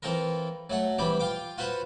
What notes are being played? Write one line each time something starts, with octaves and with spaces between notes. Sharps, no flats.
E3 C4 F4 A4 A#4
F#3 A3 F#5
E3 G3 C4 G4
F4 F5 G5 D6
F4 F#4 B4 C5 F#5